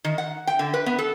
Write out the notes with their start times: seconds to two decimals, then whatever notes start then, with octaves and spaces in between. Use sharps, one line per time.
0.04 D#3
0.18 F#5
0.47 G5
0.59 D3
0.74 B4
0.86 B3
0.98 A4